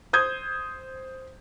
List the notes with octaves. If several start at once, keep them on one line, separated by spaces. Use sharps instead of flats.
C5 D#6 G6 G#6